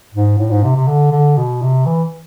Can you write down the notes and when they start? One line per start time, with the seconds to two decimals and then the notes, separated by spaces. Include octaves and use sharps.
0.14 G#2
0.38 A2
0.51 G#2
0.64 C3
0.76 C3
0.87 D3
1.12 D3
1.37 B2
1.62 C3
1.86 E3